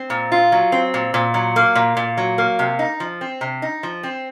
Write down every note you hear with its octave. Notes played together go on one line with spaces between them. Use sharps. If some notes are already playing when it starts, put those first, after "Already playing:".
Already playing: C4
A#2
F4
F#3
C4
A#2
A#2
F#3
A#3
A#2
A#2
F#3
A#3
C3
D#4
F3
C4
C3
D#4
F3
C4